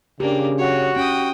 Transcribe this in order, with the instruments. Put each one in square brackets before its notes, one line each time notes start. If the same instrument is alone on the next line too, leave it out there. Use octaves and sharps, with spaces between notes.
[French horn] C#3 [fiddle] A#3 D4 [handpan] G4
[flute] F#4 [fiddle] C#5
[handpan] C#4 [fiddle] G5 D#6